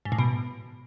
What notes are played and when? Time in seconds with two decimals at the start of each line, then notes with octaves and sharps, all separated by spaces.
0.05 G#2
0.12 A2
0.18 B2